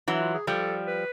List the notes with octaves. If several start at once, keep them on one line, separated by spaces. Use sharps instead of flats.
E3 F#3
F4
G#4
F3 G3 A4
B4